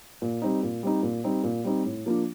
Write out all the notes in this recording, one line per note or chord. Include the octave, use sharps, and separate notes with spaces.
A#2
G3 C4 D#4
A#2
G3 C4 D#4
A#2
G3 C4 D#4
A#2
G3 C4 D#4
A2
F3 A#3 D4 F4